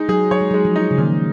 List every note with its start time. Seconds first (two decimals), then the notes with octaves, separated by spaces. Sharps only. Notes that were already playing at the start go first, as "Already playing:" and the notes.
Already playing: G#3 D#4
0.09 F#3 G#4
0.31 F#3 C#5
0.41 G#3
0.51 F#3
0.54 G#3
0.65 F3
0.76 D#4
0.91 C#3
0.98 A#2 D#3